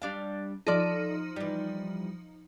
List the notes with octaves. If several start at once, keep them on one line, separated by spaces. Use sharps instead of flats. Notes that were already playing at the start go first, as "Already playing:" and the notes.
G3 D4 F5
F3 D#4 A4 D5
E3 G3